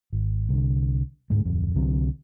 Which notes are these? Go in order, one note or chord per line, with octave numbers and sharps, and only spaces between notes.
G#1
C2 D3
D2 G#2 G#3
D1 F2
C2 D3 F#3 C4